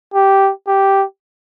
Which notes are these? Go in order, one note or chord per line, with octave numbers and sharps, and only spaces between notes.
G4
G4